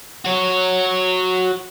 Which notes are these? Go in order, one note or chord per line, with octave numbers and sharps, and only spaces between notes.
F#4 C#5